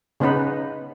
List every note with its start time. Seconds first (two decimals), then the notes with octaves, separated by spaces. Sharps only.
0.20 C#3 B3 C#4 D#4 B4